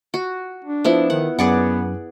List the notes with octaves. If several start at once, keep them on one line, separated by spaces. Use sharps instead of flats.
F#4
D4
F3 B3 E4
D#3 F#5
F#2 B3 G#4 D5 F#5